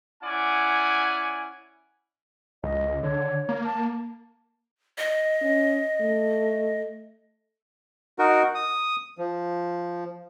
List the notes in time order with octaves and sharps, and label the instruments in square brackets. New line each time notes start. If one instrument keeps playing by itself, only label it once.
[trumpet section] C#4 E4 D5 F#5 G#5
[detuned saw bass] C#2 [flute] D#5
[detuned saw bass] D3 [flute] C#5
[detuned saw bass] A#3
[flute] A5
[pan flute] D#5
[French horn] C#4
A3
[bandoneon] D#4 F#4 A#4
D#6
F3